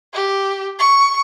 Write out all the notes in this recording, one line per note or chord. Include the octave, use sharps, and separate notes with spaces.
G4
C#6